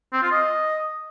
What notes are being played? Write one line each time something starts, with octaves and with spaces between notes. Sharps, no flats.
C4
F4
D#5